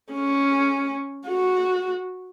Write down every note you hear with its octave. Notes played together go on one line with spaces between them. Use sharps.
C#4
F#4